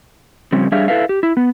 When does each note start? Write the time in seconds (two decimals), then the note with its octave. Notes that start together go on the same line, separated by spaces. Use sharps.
0.52 C#3 F3 G3 C4 C#4
0.72 G3 D4 G#4 C#5 E5 F5
0.88 E4 A4 B4 E5 F5
1.09 G4
1.23 E4
1.37 B3